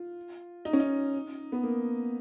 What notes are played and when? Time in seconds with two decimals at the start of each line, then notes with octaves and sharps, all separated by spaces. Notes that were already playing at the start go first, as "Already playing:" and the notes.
Already playing: F4
0.65 D#4
0.73 C#4
0.80 D#4
1.52 B3
1.63 A#3